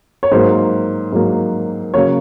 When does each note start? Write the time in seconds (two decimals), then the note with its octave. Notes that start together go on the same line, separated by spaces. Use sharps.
0.23 C#5
0.32 G#2 F#3 A#3 C5
1.13 G#2 F#3 A#3
1.94 C#3 F#3 A#3 C#5